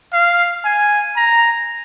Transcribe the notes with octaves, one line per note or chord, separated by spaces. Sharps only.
F5
G#5
A#5